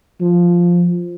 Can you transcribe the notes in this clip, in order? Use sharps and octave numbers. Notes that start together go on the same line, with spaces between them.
F3